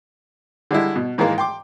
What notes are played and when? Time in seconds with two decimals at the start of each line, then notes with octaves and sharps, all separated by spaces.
0.71 D3 G3 G#3 E4
0.96 B2
1.18 G#2 D#3 E3 G#3 A#3
1.38 G5 C6 D6